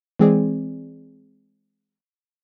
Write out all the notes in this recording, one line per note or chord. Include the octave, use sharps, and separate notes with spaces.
E3 G#3 C4 G#4 D5